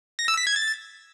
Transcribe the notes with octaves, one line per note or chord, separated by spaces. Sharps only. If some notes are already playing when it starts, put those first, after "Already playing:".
A#6
E6
B6
G#6
A6